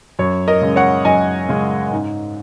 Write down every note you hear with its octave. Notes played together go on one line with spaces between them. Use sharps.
F#2 C#5
A#4 D#5
C#3 G#3 C#4
C#5 F#5
F#2 D#5 G#5
C#3 G#3 C#4
G#2